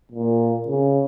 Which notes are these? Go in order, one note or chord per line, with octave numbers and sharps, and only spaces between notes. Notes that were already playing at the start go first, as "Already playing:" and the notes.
A#2
C#3